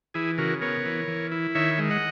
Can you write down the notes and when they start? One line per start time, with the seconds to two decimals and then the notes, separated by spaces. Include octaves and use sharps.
0.14 E3 E4 G#4
0.38 C#3 F#4 A#4
0.61 B3 A#4 C#5
0.86 E3
1.08 E3
1.32 E4
1.55 D#3 C#5 E5
1.78 G#3
1.90 D#5 F#5